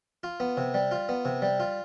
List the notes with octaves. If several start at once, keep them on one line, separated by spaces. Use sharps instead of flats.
F4
B3
C3
G3
F4
B3
C3
G3
F4